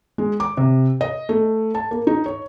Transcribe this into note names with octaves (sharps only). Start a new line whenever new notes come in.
G#3
D6
C3
D#5
A3
A5
A#3
D#4
C#5